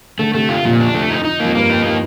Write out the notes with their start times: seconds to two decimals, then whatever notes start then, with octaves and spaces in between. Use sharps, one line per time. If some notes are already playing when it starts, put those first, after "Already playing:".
0.19 D3 A3
0.34 C3 A3
0.49 F4
0.65 F2 A#2
0.80 D4
0.95 A3
1.10 D#4
1.25 D#4
1.40 F2 A#3
1.55 G2 A#3
1.70 D#4
1.85 A#3